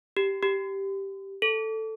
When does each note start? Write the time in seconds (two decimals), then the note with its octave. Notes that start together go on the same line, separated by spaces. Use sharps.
0.17 G4
0.43 G4
1.42 A4